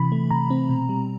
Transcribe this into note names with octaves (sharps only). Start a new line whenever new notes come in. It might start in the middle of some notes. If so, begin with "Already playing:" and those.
Already playing: C3 E3 B5
A3
C3 A#5
C4
B2
G3